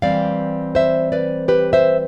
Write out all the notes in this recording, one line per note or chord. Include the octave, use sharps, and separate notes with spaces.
E3 G3 C4 D5 F5
C5 E5
B4 D5
G4 B4
C5 E5